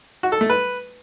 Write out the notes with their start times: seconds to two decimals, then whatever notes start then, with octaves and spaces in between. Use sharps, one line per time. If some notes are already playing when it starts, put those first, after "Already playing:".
0.23 F#4
0.32 A4
0.41 A3
0.50 B4